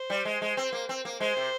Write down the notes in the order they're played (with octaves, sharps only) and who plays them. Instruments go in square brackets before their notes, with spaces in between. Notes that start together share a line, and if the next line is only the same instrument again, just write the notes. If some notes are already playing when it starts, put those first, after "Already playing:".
Already playing: [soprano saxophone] C5
[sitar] G3
G#3
G#3
C4
A#3
C4
A#3
[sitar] G#3 [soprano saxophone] C5
[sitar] C3